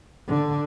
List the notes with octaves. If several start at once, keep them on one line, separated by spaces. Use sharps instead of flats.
D3